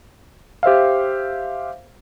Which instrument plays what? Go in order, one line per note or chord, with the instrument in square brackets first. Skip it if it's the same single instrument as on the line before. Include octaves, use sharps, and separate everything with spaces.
[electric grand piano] G4 C5 E5 F5